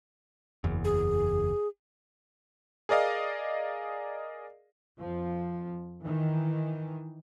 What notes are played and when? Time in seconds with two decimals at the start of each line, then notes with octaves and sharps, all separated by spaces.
0.64 F#1 E2
0.85 G#4
2.89 G#4 A#4 D5 D#5 F5
4.97 F2 F3
6.03 D#3 E3